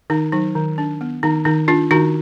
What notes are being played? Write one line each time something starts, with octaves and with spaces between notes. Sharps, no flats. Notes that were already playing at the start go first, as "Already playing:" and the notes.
D#3 D#4
F#3 D#4
D#3
D4
B3
D#3 D#4
D#3 D#4
D4 F4
D#3 D#4 F#4